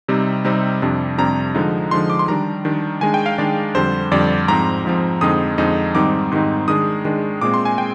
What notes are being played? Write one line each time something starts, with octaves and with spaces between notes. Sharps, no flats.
C3 G3 C4 D#4
C3 G3 C4 D#4
F2 C3 G3 D4
F2 C3 G3 D4 A#5
D3 F3 G#3 D#4
D3 F3 G#3 D#4 C6
D6
C6
D#3 G3 D4 A#5
D#3 G3 D4
D#3 G#3 D4 G#5
G5
F5
D#3 G#3 D4 D5
F2 D3 G3 C5
F2 D3 G3 D5
G#2 F3 C4 A#5
G#2 F3 C4
F2 D3 G#3 C4 D#4 D#6
F2 D3 G#3 C4 D#4
G#2 D#3 G3 C4 D#4 D6
G#2 D#3 G3 C4 D#4
D#3 G#3 D4 D#6
D#3 G#3 D4
A#2 G#3 C4 D6
C6
G#5
G#3 C4 G5